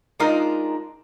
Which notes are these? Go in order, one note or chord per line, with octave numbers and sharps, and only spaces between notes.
G#3 D4 D#4 F4 A#4